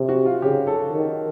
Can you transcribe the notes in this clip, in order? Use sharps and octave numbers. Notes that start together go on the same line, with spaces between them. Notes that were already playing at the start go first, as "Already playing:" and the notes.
Already playing: C3
F#4
F4
C#3 G4
A4
D#3